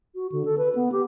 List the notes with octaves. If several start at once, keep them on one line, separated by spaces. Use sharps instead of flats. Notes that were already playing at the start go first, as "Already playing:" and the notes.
F#4
D3
A4
B4
B3
G4